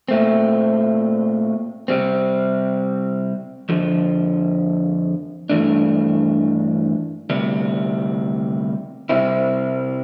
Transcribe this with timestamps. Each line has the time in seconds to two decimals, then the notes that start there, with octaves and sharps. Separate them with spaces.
0.09 A#2 A3 C4
1.88 C3 G3 C4
3.69 F2 D3 F3
5.50 G2 E3 A3 D4
7.30 D2 C3 G3
9.09 C2 C3 G3 C4 E4